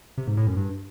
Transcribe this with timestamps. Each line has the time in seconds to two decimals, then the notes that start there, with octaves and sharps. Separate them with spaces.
0.18 C3
0.27 G#2
0.37 A2
0.47 F#2
0.57 G2